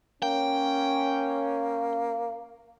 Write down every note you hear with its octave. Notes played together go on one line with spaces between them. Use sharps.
A#3 C#4 G5